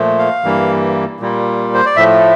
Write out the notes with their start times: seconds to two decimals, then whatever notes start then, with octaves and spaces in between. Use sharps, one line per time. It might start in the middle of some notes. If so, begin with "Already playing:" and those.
Already playing: A#2 F3 A3
0.19 F5
0.44 G2 E3 G3 A#3
1.20 A#2 G3 A#3
1.74 C5
1.86 D5
1.96 A2 F3 A3 E5